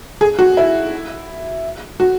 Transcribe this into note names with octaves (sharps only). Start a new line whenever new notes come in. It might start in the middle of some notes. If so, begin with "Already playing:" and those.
G#4
F#4
E4
F#4